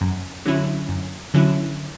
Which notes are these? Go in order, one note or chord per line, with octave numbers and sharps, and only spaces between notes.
F#2
D3 F#3 C#4 E4
F#2
D3 F#3 C#4 E4